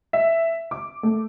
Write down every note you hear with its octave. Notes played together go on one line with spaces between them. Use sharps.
E5
D6
A3